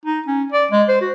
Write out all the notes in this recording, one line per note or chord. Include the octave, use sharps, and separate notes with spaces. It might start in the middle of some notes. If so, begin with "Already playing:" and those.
D#4
C#4
D5
G#3
C5
F#4